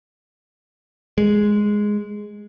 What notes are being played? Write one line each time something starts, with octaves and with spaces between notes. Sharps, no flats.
G#3